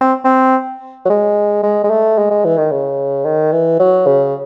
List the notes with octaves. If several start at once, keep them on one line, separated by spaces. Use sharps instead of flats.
C4
C4
F#3
G#3
G#3
G#3
A3
G#3
G#3
E3
D#3
C#3
D#3
E3
F#3
C#3